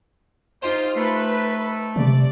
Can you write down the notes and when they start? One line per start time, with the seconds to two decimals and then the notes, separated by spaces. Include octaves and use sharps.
0.62 D#4 F4 G4 C5
0.96 A3 B4
1.96 C3 D5